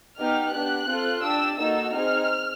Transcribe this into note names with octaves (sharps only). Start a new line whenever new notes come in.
B3 D#4 G4 F6
B3 D4 G4 F#6
C4 F4 A4
D4 G4 E6
A#3 D#4 F#4 A4 E6
C4 D#4 G#4 F6